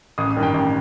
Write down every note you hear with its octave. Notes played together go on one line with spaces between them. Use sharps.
A1 D#6
D#6
G2 D#3
G5
A1